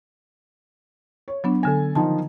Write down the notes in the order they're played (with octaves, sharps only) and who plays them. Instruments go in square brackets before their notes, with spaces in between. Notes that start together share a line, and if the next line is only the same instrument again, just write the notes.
[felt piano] C#5
[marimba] F#3 B3 D4
[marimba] D3 A#6 [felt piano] A4 G#5
[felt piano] D#3 F3 D#4 [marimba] A5